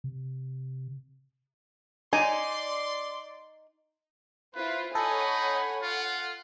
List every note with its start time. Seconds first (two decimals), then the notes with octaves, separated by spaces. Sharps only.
0.04 C3
2.13 D#4 D5 G#5 C6
4.55 E4 F4 B4 C5
4.95 D#4 A4 C#5 F#5 G#5 B5
5.82 F4 F#5